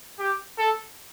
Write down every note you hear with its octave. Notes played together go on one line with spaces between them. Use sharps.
G4
A4